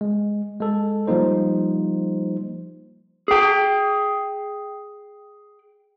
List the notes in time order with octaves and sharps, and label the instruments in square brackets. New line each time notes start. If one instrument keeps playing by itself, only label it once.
[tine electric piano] G#3
G#3 A4
F3 G3 A#3 D#4 C5
[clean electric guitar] G#4 G5